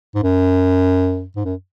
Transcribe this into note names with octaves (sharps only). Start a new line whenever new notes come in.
G#2
F#2
G#2
F#2